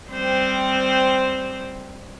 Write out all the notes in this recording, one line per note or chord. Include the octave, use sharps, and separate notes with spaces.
G3 C4 C5